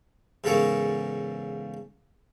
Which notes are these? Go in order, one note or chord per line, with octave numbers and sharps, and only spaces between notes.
E2 G#2 C#3 A4 A#4 C#5